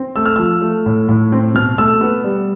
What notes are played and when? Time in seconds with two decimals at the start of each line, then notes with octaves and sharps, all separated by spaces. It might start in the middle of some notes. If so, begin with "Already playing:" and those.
Already playing: C4
0.16 A3 E6
0.26 F6
0.36 F3 E6
0.62 A3
0.86 A2
1.09 A2
1.32 C4
1.55 B2 F6
1.78 A3 E6
2.01 B3
2.24 G3